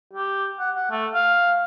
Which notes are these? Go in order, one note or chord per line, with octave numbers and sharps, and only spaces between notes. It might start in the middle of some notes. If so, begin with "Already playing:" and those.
G4
F#5
F#5
A3
F5